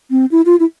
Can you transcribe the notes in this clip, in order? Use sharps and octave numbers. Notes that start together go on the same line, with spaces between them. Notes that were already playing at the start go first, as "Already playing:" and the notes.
C4
E4
F4
E4